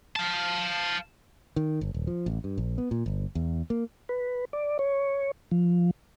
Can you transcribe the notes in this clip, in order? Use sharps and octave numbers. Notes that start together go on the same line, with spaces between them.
F5 A5
D#3
G1
D#1
F3
A1
G2
A#1
B3
A#2
G1
E2
A#3
B4
D5
C#5
F3